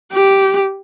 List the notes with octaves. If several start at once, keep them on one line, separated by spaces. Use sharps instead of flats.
G4